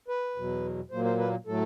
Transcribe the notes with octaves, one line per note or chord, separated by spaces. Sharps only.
B4
E2 B2 F#3
A#2 F#3 A#3 C5
C5
B4
A2 F#3 A3 A4